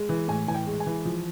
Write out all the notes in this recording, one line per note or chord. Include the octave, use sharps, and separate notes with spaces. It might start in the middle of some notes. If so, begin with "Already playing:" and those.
Already playing: G#3
E3
A2 G#5
E3 G#5
G5
G#3
G#5
E3
F3